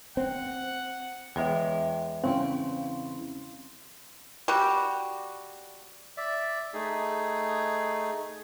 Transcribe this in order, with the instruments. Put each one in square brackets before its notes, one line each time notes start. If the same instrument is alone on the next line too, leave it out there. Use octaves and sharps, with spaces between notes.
[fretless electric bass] C4 [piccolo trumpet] F#5
[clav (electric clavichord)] E2 G#3 [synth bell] C#5 E5 G5
[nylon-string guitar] C#3 E4 G5 [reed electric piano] C4 C#4 [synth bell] F5 C6
[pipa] G3 F#4
[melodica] D5 E5
A3 D#4 G#4